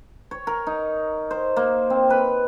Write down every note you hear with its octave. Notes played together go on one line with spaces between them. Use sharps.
C#5
A#4
D#4
C5
A#3
C4
B4